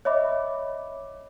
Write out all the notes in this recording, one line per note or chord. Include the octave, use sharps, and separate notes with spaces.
C#5 D#5 E5 B5 D6